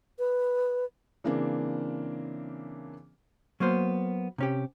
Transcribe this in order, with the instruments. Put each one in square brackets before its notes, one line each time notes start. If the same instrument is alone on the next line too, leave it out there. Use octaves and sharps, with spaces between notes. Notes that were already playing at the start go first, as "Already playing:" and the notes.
[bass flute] B4
[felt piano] C#3 E3 A#3 C4 D4
[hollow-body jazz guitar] F#3 A#3 B3 C5
C3 C#4 G4